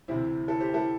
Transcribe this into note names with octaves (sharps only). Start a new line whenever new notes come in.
D2 C3 E3 C4 E4
E4 A4
G4 C5
E4 A4